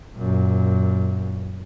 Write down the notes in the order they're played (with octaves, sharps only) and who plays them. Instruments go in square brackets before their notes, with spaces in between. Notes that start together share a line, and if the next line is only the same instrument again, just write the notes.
[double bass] F#2 A#2